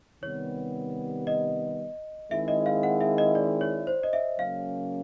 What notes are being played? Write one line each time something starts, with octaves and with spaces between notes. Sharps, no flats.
C3 D#3 G3 B3 C#5
D#5
D#3 G#3 C4 E4 G#4 E5
D#5
F5
F#5
E5
D#5
D5
C#5
C5
D#5
E5
C#3 F#3 A#3 C#4 F5